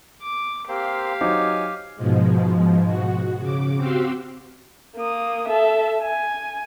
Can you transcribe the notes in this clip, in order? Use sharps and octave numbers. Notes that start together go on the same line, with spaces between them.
D6
A#3 C4 G4 C5 F5
F#3 D#4 C5 G#5 D6
G#2 B2 F3 G#3
F#4
C#3 D6
C4 F#4 G4 F5 C6 E6
A#3 D#6
A4 E5
G#5